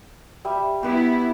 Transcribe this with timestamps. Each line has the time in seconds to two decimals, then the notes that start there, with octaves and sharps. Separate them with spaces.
0.45 G3 E5
0.83 B3 E4 G4 B4